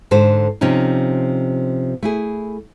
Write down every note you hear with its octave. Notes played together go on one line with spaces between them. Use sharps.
G#2 D3 A4 C5
C3 F3 C#4 D#4
A3 E4 G#4